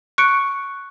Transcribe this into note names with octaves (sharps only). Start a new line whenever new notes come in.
C#6 F#6 C#7 D7